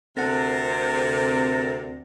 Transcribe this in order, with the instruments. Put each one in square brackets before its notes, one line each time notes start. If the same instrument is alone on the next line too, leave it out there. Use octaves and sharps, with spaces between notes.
[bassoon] D2 [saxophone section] C3 [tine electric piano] C4 F#5 A5 [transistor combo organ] A4 A#4